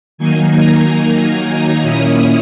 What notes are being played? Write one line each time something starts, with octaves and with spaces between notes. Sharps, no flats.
D#3 F#3 A#3 D#4 G#5
A#5
A#2 A#3 C#4 E4 D#6